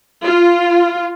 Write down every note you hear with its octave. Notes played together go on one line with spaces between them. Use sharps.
F4